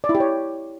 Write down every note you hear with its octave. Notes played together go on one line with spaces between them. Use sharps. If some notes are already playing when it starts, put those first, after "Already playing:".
D5
E4
G4
C#5